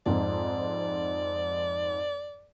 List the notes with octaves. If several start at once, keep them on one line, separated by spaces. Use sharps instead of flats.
F2 G#2 D5